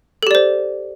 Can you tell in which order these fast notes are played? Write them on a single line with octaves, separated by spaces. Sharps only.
A4 G4 D5 C5